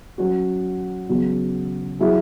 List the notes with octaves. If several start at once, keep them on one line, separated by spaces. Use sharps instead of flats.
F#3 C#4 F#4
C#3 F#3 B3
F#3 E4 G#4